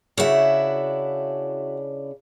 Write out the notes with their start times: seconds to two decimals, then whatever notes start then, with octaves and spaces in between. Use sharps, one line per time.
0.18 C#3 D4 E4 F#4 E5